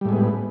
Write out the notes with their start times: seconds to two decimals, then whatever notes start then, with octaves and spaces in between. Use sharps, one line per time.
0.01 G3
0.05 A2
0.09 G#3
0.13 B3